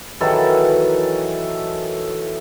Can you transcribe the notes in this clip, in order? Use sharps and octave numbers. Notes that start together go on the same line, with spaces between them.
D#3 E3 F#3 A4